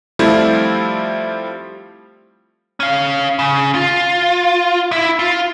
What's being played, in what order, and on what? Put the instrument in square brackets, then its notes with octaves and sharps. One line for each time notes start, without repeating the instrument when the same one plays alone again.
[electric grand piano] F3 G3 A3 C4 E4 F4
[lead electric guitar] C#4 F5
C#3
F4
E4 E5
F4